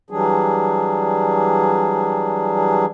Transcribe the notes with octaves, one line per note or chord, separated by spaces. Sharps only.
E3 F#3 G3 D4 G#4